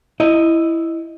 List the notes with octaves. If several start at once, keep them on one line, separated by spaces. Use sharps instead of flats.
E4 D#5